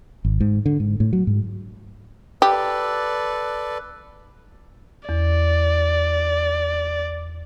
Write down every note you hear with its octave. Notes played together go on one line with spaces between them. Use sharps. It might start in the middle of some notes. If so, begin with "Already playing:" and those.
G#1
G#2
D3
G#2
A2
F#3
G#2
G4 A4 B4 D5
E2 D5